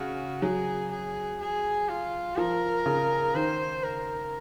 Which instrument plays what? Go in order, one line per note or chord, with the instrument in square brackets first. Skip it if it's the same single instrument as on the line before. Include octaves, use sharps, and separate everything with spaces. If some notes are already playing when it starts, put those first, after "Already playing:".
Already playing: [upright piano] C#3 [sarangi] F#4
[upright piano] F#3 [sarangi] G#4
[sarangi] G#4
G#4
F4
[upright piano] F3 [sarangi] A#4
[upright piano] C#3
[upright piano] D#3 [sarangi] C5
[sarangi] A#4